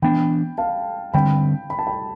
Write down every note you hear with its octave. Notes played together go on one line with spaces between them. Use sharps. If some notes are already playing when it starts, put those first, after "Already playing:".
E3 B3 D4 G5 B5
F5 A5
D3 G3 C4 G5 B5
B5
A5
G5 B5